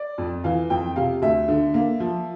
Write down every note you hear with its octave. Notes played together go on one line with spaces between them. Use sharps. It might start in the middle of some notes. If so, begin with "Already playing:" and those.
Already playing: D5
F2
E3 F5
F2 G5
C3 F5
D2 E5
D3
A#3
F3